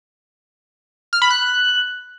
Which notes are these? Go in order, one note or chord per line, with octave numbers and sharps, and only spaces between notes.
F6
B5
F#6